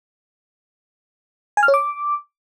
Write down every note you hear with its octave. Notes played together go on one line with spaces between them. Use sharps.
G#5
F6
C#5
D6